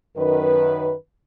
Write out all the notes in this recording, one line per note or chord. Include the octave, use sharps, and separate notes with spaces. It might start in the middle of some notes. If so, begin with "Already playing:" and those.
F#2 D#3 B4